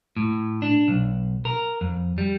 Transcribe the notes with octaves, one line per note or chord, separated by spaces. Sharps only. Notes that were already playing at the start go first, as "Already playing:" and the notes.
A2
D4
B1
A#4
F2
G3